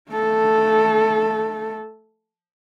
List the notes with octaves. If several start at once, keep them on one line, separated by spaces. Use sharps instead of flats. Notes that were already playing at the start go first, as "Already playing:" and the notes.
A3 A4